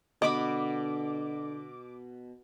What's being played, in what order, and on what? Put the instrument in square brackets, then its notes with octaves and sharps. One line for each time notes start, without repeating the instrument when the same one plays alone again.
[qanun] B2 B3 B5 [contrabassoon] D3 [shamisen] D#5 [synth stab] D6